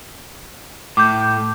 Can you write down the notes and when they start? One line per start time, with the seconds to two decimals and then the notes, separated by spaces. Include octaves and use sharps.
0.97 A2 D6 G6